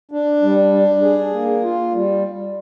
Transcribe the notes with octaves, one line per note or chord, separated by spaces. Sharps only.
D4
G3
D4
G#4
A#3
F4
G3